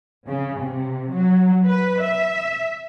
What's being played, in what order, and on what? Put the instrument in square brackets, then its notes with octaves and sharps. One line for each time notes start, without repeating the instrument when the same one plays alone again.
[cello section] C#3
C3
F#3
B4
E5